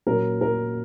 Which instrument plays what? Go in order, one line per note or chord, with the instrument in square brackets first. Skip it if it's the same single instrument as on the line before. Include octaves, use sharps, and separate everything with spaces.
[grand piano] A#2 F#3 A#3 C#4 A#4
A#4